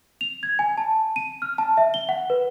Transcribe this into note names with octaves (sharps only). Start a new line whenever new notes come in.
F7
G#6
G#5
A5
D#7
F6
A5
E5
G7
F#5
B4